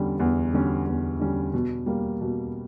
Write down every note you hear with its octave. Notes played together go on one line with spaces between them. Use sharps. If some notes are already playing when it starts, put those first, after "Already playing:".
Already playing: E2 D3 G3 C#4
E2
D3 G3 C#4
E2
D3 G3 C#4
B2
G3 A#3
B2